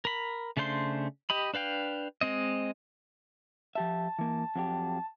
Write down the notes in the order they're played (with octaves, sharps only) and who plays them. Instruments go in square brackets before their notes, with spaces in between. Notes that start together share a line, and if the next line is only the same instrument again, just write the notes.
[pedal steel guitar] A#4 B5
C#3 A3 D4 C5 C6
G4 D#5 B5
D4 B4 F5 G5
G#3 C4 D#5
[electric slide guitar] F3 G4 E5 [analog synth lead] A5
[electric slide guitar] E3 A#3
F2 F#3 G4